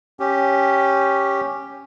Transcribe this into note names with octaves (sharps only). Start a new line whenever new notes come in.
C#4 G4